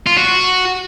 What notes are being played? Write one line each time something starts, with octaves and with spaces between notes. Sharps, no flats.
F4
F#4